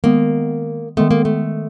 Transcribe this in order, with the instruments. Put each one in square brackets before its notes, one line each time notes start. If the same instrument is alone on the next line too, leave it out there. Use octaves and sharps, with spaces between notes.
[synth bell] D#3 G#3 B3 [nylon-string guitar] A#3
[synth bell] D#3 G#3 B3 [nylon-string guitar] A3
[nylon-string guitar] A#3
A3